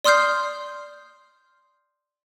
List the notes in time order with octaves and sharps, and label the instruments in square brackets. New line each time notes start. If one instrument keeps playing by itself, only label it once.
[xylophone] D5 C6 D#6 F6 G6 C7